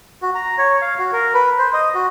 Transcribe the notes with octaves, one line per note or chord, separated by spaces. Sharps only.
F#4
A#5
C#5
F5
F#4
A#4
B4
C5
D#5
F#4